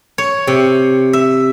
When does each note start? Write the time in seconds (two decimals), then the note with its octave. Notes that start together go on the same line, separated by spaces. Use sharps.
0.18 C#5
0.47 C3
1.13 E5